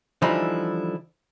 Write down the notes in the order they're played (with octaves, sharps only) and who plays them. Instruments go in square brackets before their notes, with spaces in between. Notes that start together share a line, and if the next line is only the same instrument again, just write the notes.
[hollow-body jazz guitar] D3 E3 F3 G3 D#4 E4